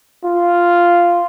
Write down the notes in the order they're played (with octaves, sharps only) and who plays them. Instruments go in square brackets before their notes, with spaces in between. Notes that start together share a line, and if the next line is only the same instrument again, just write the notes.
[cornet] F4